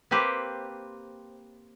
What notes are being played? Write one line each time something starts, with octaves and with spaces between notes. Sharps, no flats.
A#3 C4 G4 B4 C5